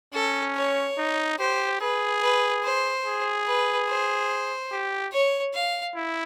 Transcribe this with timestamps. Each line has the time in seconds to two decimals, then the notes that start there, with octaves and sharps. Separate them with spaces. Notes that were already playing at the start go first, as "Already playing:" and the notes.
0.13 C#4 A4
0.56 C#5
0.98 D#4
1.39 G4 C5
1.80 G#4 B4
2.22 B4
2.64 C5
3.05 G#4
3.46 B4
3.88 C5
4.71 G4
5.12 C#5
5.54 F5
5.95 E4